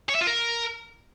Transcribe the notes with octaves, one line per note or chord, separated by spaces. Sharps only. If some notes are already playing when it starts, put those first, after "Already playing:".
C#5
E5
F4
A#4